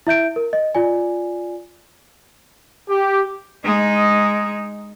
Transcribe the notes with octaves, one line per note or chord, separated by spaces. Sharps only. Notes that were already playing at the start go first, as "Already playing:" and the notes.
E4 E5 G6 D7
A#4
D#5
F4 D5 G#5
G4
G#3 D#4